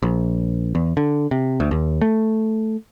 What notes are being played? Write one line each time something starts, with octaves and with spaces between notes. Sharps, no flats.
A#1
E2
D3
C3
D2
D#2
A3